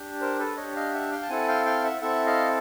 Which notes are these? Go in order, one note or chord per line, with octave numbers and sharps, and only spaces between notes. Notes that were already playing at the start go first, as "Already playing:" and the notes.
Already playing: D4 G4
A#4 C5
A4 B4
D4 G4 C#5 D#5
D#5 F5
E5 F#5
F5 G5
A5
C4 E4 A4 F#5 G#5
F5 G5
F5 G5
E5 F#5
C4 E4 A4 E5 F#5
D#5 F5